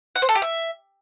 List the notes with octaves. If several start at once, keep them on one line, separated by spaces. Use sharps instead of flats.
F#5
C5
A4
G4
E5